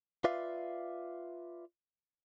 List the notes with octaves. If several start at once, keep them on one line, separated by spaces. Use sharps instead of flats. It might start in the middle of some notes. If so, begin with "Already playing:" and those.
F4 B4 D5 E5 F5